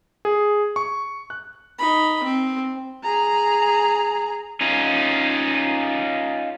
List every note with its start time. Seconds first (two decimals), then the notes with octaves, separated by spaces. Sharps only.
0.25 G#4
0.76 C#6
1.30 F#6
1.78 D#4 B5
2.24 C4
3.03 G#4 A#5
4.61 C#4 D#4 F4